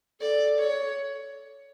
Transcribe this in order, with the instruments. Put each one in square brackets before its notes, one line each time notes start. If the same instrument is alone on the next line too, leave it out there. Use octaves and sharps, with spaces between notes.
[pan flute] A4 [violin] D5
[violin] C#5